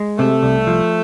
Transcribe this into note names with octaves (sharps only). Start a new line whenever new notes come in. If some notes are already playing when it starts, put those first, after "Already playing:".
Already playing: G#3
C3 A3
C2
F3